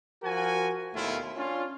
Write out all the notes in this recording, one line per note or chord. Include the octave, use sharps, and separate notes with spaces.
F3 F#4 A#4 G#5
D#2 B2 A3 E4 F4
C#4 D4 F4